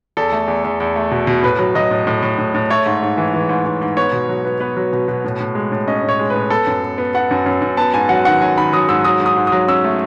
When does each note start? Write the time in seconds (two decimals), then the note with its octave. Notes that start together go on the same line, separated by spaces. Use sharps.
0.17 E2 A4
0.32 A3
0.48 E2
0.64 E2
0.80 E2
0.96 A3
1.11 B2
1.27 B2
1.43 A2 B4
1.59 F#3
1.75 F#3 D#5
1.91 A2
2.07 A2
2.23 A2
2.39 A2
2.55 A2
2.70 A3 C#5
2.86 G#2
3.02 G#2
3.17 E3
3.34 E3
3.49 G#2
3.66 G#2
3.82 G#2
3.97 B3 C#5
4.12 B2
4.28 F#3
4.45 B3
4.60 B3 B4
4.77 F#3
4.93 B2
5.08 B2
5.24 A2
5.40 A2
5.55 G#3
5.72 A2
5.88 C#4 D#5
6.04 A2 C#5
6.19 G#3
6.30 A2 B4
6.50 B3 A4
6.67 F#2
6.83 B3
6.98 B3
7.14 B3 F#5
7.31 F#2
7.46 F#2
7.62 F#2
7.77 B3 A5
7.94 G#2 G#5
8.09 F#3 F#5
8.25 D#3 F#5
8.41 F#3 G#5
8.57 D#3 B5
8.73 F#3 D#6
8.89 G#2 E6
9.05 F#3 D#6
9.20 G#2
9.26 D#6
9.36 G#2
9.47 D#6
9.52 F#3
9.68 C#4 E6
9.84 A3